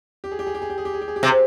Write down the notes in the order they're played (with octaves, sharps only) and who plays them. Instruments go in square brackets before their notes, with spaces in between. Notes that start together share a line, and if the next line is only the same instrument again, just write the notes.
[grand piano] G4
G#4
G4
G#4
G4
G#4
G4
G#4
G4
G#4
G4
G#4
G4
[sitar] C3 [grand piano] G#4
[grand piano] G4